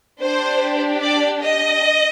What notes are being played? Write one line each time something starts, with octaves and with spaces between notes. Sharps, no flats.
D4 G4 C5
D5
D#5